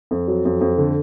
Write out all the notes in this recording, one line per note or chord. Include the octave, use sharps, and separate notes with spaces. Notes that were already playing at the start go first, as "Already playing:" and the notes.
F2
F#3
F2
F2
D3